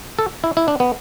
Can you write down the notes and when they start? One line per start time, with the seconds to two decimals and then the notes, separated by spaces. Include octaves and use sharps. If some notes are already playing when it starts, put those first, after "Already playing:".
0.19 A4
0.44 E4
0.57 E4
0.68 D4
0.80 B3